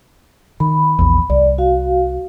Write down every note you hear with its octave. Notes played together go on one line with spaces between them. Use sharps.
D#3 B5
A#1 E2
C2 D5
F#4 F5